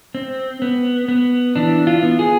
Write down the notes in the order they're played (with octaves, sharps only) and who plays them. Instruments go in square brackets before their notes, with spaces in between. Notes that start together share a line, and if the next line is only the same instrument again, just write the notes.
[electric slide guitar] C4
B3
B3
E3 D4
F4
B3
G#4